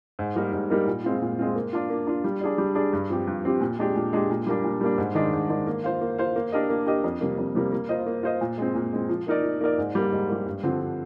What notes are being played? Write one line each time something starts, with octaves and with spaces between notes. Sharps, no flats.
G#2
G3 A#3 D#4 A#4
G#2
G3 A#3 D#4 A#4
A#2
G#3 C4 F4
A#2
G#3 C4 F4
A#3
D4 F4
A#3
D4 F4
G3
D4 G#4 D5
G3
D4 G#4 D5
G2
F3 C4 G4
G2
F3 C4 G4
A#2
G#3 D4 G4
A#2
G#3 D4 G4
A#2
G3 A#3 D4
A#2
G3 A#3 D4
G#2
D#3 G#3 D4
G#2
D#3 G#3 D4
A#3
F4 C5 F5
A#3
F4 C5 F5
A#3
D4 G4 A#4 D#5
A#3
D4 G4 A#4 D#5
F2
C3 G3 A#3
F2
C3 G3 A#3
A#3
F4 C5 D#5
A#3
F4 C5 D#5
A#2
G#3 C4
A#2
G#3 C4
F3
A#3 D#4 A#4 D5
F3
A#3 D#4 A#4 D5
G#2
G3 A#3
G#2
G3 A#3
G2
D3 F3 C4